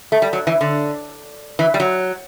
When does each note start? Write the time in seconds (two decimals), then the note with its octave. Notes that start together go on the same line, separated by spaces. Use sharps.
0.12 A3
0.22 G3
0.33 F#3
0.47 E3
0.61 D3
1.59 E3
1.74 G3
1.80 F#3